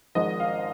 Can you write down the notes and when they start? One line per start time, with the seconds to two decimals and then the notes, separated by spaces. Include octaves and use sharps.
0.15 G#1 G#2 F3 G#3 D#5
0.40 F5